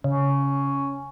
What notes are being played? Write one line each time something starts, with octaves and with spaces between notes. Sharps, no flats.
C#3 C#4